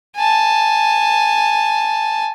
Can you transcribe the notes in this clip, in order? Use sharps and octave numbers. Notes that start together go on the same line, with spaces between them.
G#5 A5